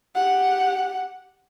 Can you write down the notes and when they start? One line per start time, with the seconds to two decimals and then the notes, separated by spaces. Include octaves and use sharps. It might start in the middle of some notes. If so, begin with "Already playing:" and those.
0.15 G4 F#5